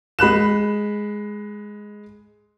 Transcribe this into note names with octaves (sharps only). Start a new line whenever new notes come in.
G#3 B5 F#6 E7